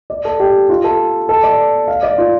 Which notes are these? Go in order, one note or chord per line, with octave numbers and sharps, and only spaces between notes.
D5
A4
G4
F4
A4
A4
D5
F5
D5
F4